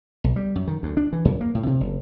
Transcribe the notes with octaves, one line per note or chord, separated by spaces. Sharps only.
B1
G3
F#2
D#3
D2
D4
E3
F#2
A#3
A2
C3
F#1